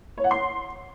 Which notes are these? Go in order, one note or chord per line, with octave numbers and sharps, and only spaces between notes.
C#5
F#5
C6